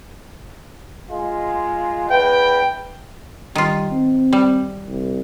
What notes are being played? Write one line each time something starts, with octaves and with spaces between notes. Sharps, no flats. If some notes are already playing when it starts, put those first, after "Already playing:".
G#3 F4
E2 B4 G5
D#3 G3 F4
C4
G3
C2